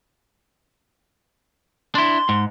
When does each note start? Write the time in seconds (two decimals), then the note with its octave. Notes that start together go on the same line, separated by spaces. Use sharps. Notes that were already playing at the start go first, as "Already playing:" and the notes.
1.95 D4 E4 C6
2.29 G#2